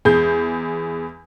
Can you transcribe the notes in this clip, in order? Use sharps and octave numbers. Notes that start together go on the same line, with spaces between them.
E2 G#3 G#4 G6